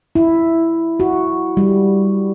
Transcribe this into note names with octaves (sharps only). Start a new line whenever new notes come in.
E4
F#4
G3